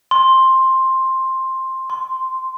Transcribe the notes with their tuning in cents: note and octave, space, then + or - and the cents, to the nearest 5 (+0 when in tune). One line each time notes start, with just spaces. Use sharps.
C6 +10
C6 -5